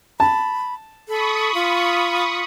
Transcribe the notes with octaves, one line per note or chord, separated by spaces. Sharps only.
A5 B5
A4 B5 C#6 D#6
F4